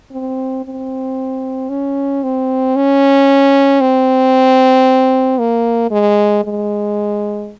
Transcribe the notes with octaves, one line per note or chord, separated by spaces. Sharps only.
C4
C4
C#4
C4
C#4
C4
A#3
G#3
G#3